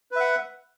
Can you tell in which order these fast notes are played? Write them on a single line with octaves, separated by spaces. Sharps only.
B4 E5 F#5